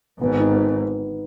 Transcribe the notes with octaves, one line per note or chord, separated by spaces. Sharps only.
G#1 G#2 B3
D#4